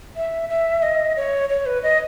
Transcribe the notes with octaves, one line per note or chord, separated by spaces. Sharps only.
E5
E5
D#5
C#5
C#5
B4
D#5